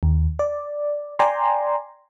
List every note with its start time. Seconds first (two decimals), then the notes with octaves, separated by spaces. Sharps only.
0.03 D#2
0.39 D5
1.19 D5 G5 G#5 A#5 C6